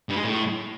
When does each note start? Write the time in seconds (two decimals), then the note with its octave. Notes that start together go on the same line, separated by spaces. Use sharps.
0.09 G2
0.17 G#3
0.24 A2